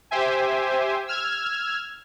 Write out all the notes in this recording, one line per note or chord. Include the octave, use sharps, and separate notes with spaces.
G4 C5 E5 G#5
E6 F6 G#6